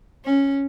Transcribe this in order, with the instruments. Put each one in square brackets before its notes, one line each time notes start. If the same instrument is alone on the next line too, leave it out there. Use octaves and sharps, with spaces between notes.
[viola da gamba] C#4